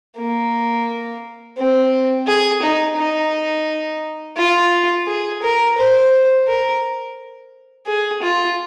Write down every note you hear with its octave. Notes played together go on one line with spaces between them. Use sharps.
A#3
C4
G#4
D#4
D#4
F4
G#4
A#4
C5
A#4
G#4
F4